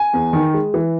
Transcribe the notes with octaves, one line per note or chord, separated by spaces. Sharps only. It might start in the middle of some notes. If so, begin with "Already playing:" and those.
Already playing: G#5
E2
D#3
G#3
E3